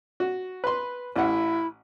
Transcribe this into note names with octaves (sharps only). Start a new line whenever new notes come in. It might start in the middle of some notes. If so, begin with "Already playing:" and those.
F#4
B4 C6
A1 E4 F#5